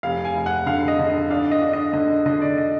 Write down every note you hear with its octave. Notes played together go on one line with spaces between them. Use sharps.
F1 F5
G#5
F1
F#5
D3 F5
D#5
D3
D#5
D4 F5
D#5
D4
D#5
D3 D#5
D3 D#5
D5
D#5